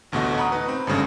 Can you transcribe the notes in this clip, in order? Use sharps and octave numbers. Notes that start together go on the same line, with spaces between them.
A1 D2 B2 A3 F#4 D#5
F#5 A#5 B5 C#6 D#6
D#4 B4
C4
G#1 G2 C#3 A3